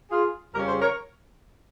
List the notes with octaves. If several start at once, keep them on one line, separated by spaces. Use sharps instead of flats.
F4 G#4
F2 C#3 G3 C#4 G4 A#4
G#4 C5
A#4 C#5